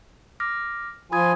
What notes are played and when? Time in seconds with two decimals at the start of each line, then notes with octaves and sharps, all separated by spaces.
0.40 D6 F6 A#6
1.12 F3 F4 G#5 B5 D#6 G#6